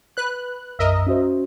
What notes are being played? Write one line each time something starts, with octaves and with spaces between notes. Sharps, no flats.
B4 F#6
B1 F#2 A#4 D#5 E5
C#4 F#4 C5